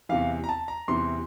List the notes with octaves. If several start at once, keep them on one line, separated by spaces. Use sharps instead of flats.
E2 C3 E3 F5
A#5
A5
A#5
E2 C3 E3 C6